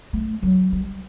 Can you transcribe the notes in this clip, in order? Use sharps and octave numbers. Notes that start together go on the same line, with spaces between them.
A3
F#3
G3